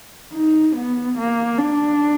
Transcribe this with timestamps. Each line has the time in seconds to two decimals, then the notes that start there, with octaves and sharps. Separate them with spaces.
0.33 D#4
0.76 B3
1.18 A#3
1.58 D4